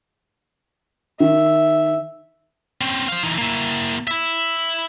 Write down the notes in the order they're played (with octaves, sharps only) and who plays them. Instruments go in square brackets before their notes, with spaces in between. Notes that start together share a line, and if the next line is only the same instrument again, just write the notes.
[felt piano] D#3 [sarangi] E5
[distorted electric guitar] C4 C#4
C5 F5
E3 D#4
A#3 E4
E4 E5